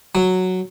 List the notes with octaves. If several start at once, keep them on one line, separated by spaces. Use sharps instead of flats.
F#3